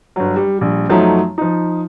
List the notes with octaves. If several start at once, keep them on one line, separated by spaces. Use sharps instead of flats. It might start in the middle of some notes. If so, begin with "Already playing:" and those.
G1 F#3
G3
A#1 G3
F#2 F3 F#3 A3 C#4 D#4
F3 D#4